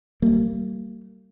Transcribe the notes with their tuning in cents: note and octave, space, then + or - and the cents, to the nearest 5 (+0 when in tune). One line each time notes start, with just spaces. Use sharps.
G3 -30 A#3 -35